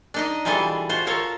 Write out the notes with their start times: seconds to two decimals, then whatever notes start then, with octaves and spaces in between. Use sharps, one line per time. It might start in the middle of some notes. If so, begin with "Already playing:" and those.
0.14 D4 D#4 D#5
0.45 B2 E3 G3 F4 G#4 A4
0.89 F4 F#4 C5
1.07 F4 A4 A#4 C#5